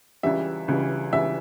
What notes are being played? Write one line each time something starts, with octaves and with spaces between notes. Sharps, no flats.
C#2 C#3 E3 G3 E5
C#2 C#3 E3 G3
C#2 C#3 E3 G3 E5